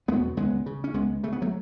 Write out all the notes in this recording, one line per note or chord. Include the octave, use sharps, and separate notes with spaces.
E2 B2 G#3 B3
C#2 G#3 B3
C#3
C#4
C#2 G#3 B3
C#3 A3
B3
F#3 A3